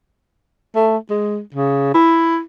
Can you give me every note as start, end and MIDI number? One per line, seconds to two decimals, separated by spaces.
0.75 0.98 57
1.10 1.40 56
1.54 1.90 49
1.94 2.40 64